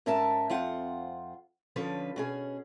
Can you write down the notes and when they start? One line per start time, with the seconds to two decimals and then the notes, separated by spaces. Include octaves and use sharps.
0.06 G#2 C#4 A#4 E5 A5
0.50 F2 C4 F4 F#5
1.76 D3 F3 C#4 B4
2.16 B2 C#4 G#4